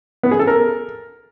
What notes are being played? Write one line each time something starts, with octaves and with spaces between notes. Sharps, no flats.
B3
G#4
A4
A#4